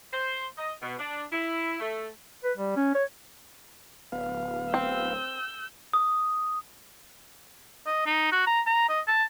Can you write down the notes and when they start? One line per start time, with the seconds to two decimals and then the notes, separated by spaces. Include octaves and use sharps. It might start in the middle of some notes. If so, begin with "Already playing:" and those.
0.13 C5
0.58 D#5
0.82 B2
0.99 D4
1.32 E4
1.80 A3
2.44 B4
2.57 G3
2.76 C#4
2.94 C#5
4.12 D1 B3 F5
4.74 C4 E6 G6
5.93 D#6
7.86 D#5
8.06 D#4
8.32 F#4
8.47 A#5
8.66 A#5
8.89 D#5
9.07 A5